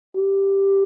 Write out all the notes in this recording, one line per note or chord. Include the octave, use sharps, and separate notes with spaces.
G4